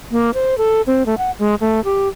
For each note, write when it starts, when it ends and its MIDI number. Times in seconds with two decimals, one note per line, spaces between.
0.11 0.31 58
0.34 0.57 72
0.58 0.82 69
0.87 1.06 60
1.06 1.18 57
1.18 1.31 78
1.39 1.55 56
1.61 1.83 57
1.84 2.08 67